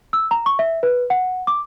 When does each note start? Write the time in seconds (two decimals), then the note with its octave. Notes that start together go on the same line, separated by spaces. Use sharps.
0.13 E6
0.31 A#5
0.46 C#6
0.59 E5
0.83 B4
1.10 F#5
1.47 D6